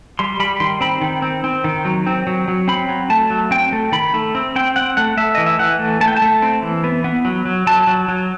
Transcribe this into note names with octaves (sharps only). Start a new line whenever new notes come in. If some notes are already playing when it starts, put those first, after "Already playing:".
G3 C6
G3 B5
D#3 C6
C4 B5
D#3
C4
C4
D#3
F#3
C4
F#3
F#3
C4 B5
F#3
A3 A5
F#3
C4 G5
A3
D#3 B5
A3
C4
C4 G5
C4 F#5
A3 F#5
A3 E5
E3 D#5
E5
E3 F#5
A3
A3 A5
G5
A5
A3
C4
E3
B3
B3
F#3
F#3
F#3 A5
F#3
F#3